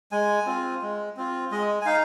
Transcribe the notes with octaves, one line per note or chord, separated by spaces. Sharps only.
G#3 G#5
C4 F4
G#3
C4 F4
G#3 D#5
G#5
D#4 F5